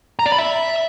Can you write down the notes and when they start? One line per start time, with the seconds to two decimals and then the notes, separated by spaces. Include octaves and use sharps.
0.19 A#5
0.26 D5
0.32 B5
0.38 E5